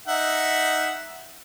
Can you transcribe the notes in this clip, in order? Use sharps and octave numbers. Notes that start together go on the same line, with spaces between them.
D#4 E5 F#5